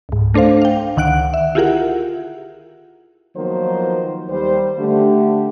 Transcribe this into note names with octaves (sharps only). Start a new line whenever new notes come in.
C#2 G#2
A3 D4 A4 C5 F5
F5 G5
C#2 D3 D#3 F#5 F#6 D7
E5
E4 F4 G4 G#4 A#4 F#5
D#3 F3 F#3 A#3 B3 C5
D#2 G3 C5
D3 A3 G4